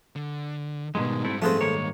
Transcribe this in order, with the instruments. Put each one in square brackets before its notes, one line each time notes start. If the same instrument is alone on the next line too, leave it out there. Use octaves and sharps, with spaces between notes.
[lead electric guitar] D3
[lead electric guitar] G#2 G3 [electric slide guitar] B2 D#3 G#3
[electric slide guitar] A3 C4 E4
[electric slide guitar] F3 B3 C4 [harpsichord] A3 G#4 C5
[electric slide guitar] D#3 A#3 C#5